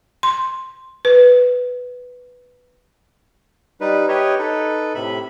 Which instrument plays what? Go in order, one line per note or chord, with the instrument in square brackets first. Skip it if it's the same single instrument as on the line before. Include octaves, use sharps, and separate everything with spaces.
[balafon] C6
B4
[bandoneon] G3 D#4 B4
G4 B4 C#5 D#5 E5
D#4 A4 B4
A2 C3 E5 B5